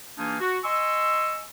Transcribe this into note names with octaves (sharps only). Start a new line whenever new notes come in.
E3 A#3 D4 D#4 F4 G#4
F#4
D#5 G#5 C6 C#6 E6